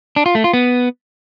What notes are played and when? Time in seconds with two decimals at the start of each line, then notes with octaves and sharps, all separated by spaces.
0.16 D4
0.26 F4
0.35 A3
0.44 F4
0.53 B3